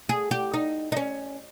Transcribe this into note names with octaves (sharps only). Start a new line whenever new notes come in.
G#4
G4
D#4
D#4
C#4